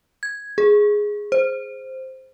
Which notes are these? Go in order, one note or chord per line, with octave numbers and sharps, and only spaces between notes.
G#6
G#4
C5